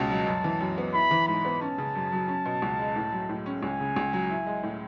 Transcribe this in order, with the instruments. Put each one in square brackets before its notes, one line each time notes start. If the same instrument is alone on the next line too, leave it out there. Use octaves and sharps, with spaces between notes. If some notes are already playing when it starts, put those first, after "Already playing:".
Already playing: [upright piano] C#2 B2 C#4 [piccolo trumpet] A5
[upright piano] F#3
F#2
E3
F#2
B3
[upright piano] E4 [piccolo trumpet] B5
[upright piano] E3
[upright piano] G#2 [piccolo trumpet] B5
[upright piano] B3
[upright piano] C#4 [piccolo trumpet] A5
[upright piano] C#3
F#2
F#3
C#4
B2
C#2
G#3
A2
F#3
A2
C#4
[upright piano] C#2 [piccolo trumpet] G#5
[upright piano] C#3
C#2
F#3
E4
G#3
A2